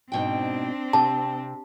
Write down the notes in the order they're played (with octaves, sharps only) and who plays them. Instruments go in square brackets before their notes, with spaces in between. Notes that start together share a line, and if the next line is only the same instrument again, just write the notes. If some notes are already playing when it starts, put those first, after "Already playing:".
[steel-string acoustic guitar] G#2 B2 G5 [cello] C4 D4
[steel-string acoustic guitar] C3 [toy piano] A5